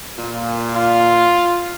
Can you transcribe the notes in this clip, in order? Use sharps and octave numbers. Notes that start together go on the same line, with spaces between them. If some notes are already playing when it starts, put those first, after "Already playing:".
A#2
F4